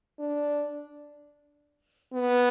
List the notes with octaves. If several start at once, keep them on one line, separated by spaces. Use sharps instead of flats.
D4
B3